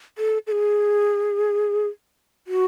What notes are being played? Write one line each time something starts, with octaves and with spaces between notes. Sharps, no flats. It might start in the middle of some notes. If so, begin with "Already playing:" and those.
A4
A4
G#4
F#4